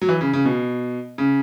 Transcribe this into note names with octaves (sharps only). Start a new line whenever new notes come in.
F#3
E3
C#3
C#3
B2
C#3